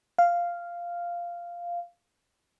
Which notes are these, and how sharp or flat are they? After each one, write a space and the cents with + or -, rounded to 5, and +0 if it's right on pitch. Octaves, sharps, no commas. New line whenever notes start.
F5 -5